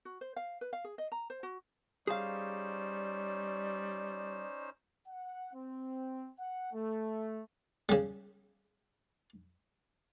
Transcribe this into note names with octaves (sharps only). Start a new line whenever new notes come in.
F#4
C5
F5
B4
F5
G#4
D#5
A#5
C5
F#4
G3 C#4 D#4 G#4 C5 D5 F5
F#5
C4
F#5
A3
C#3 G3